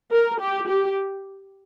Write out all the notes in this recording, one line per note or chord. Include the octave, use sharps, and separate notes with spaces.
A#4
G4
G4